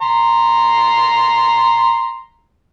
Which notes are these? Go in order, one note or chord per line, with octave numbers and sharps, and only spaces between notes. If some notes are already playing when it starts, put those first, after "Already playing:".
A#5 C6